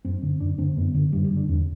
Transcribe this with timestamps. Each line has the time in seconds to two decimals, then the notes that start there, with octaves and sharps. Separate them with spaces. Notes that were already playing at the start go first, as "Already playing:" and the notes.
0.05 F#2 C4
0.23 D3 C4
0.40 F#2 D4
0.58 D3 C4
0.77 F#2 B3
0.94 D3
1.12 F#2 G3
1.24 G3
1.30 D3
1.37 D4
1.48 E2 C4